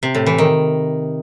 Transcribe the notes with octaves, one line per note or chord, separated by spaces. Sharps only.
C3
A2
E3
D#3